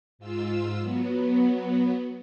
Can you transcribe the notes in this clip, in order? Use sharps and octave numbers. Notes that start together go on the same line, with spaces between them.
G#2 F4 E6
F#3 B3